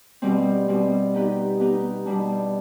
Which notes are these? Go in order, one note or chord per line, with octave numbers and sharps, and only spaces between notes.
B2 G3 C4
B2 G3 C4
B3 D#4 G4 B4
B3 D#4 G4 B4
B2 G3 D4